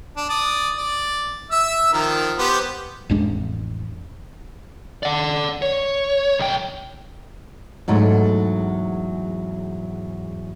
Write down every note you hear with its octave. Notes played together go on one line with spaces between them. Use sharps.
D4
D5 D#6
D5
E5 E6
D#3 F3 A#4
B3 G4 C5
A1 F2 G#3 D4
D5 F#5
C#5
B1 G5
E2 G#2 F#3 A3